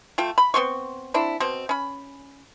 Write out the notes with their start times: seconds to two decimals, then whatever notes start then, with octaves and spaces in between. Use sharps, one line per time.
0.18 A3 F4 G5
0.38 B5
0.54 B3 C4 C6 C#6
1.14 C4 D4 E4
1.40 B2 C4
1.69 C#4 B5